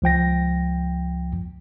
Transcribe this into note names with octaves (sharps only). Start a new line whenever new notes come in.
C#2 F3 G5 A#6